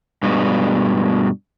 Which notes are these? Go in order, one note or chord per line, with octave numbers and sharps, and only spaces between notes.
G2 B2 G#3